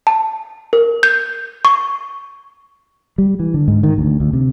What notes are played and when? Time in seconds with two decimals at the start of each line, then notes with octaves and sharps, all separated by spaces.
0.07 A5
0.73 A#4
1.03 G6
1.65 C#6
3.18 G3
3.40 E3
3.54 D3
3.68 G#2
3.83 D#3
3.98 D2
4.20 D2
4.33 C3